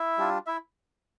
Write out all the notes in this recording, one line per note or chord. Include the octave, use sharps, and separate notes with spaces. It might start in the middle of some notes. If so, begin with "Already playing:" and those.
Already playing: E4 E5
G3 D4 F4
E4 E5